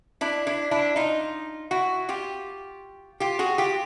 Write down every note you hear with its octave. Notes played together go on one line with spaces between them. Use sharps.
D4 E4
D4 E4
D4 E4
D#4 F4
E4 F#4
F4 G4
F4 G4
F#4 G#4
F4 G4